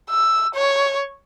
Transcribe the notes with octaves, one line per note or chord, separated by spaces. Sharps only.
E6
C#5